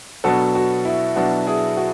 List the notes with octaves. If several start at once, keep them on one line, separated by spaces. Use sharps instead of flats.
B2 F#3 B3 D4 F#4 A4
F#4
E4
B2 F#3 B3 D4 F#4
E4 G#4
F#4